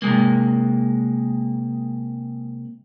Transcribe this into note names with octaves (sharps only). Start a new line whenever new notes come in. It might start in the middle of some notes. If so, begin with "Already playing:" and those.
C3 F3 G#3 A#3